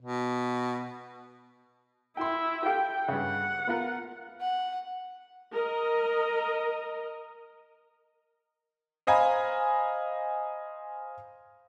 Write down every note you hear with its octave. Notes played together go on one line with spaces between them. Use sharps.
B2
E4 G5 C6
G4 A4 F5 G5
G2 C#3 F#5
B3 F4 A#4
F#5
A#4 D#5
C5 D#5 F5 G#5 A#5 B5